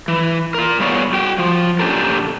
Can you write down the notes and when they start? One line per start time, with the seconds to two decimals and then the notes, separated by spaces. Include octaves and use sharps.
0.08 E3
0.54 F4 A#4
0.80 G3 B3 G#4 C#5 D5 F5
1.13 F#4 G5
1.38 F3
1.79 A#2 D3 C#4 G4 A4 A#4